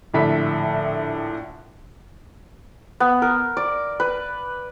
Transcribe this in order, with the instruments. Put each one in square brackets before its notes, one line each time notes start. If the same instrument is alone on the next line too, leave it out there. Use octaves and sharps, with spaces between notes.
[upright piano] A#1 A2 D3 E5 B5 B6
[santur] B3
A#4
D5
B4